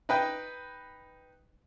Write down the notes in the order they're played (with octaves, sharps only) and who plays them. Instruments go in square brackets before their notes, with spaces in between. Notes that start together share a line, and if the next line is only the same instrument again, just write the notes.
[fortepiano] D#4 B4 G5